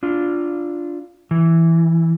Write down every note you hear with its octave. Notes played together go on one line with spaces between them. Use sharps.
D4 F4
E3